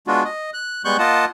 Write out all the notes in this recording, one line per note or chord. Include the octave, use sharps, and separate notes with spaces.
G#3 B3 D4 F4 F#4
D#5
F#6
G3 G#3 B3 C#6 F#6 G6
A#3 F4 D#5 F#5 A5